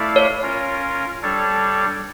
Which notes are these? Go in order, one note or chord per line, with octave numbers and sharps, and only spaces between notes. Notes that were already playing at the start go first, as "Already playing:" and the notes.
Already playing: A3 E4 A4 D5 F5
C#5
C#4 F4 A#4
G3 D4 A4 C#5